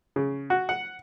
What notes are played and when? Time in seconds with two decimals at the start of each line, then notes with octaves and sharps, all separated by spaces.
0.16 C#3
0.50 F#4
0.69 F#5